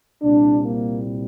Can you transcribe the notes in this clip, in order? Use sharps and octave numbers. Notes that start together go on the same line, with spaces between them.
C2 A#2 G3 D4
A#3